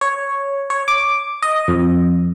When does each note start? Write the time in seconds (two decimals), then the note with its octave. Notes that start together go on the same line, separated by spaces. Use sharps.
0.01 C#5
0.70 C#5
0.88 D6
1.42 D#5
1.68 F2